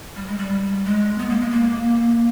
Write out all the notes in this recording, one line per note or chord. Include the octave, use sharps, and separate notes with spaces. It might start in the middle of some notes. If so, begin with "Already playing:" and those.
G3
G#3
G3
G#3
B3
A#3
G#3
A#3